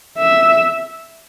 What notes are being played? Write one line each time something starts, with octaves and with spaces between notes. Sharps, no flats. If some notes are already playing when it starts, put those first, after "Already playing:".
E5